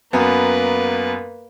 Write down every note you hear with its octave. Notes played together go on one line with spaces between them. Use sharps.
F#2 A#3 B3 B4